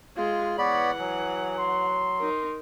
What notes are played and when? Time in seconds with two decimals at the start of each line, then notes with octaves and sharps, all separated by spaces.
0.17 G#3 F4
0.58 E3 B3 C#5 D5 F#5 B5
0.99 F#3 G#4
1.58 C6
2.19 D#4 A#4